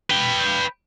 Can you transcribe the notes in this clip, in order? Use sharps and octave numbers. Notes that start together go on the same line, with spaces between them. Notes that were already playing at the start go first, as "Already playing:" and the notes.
B4 G5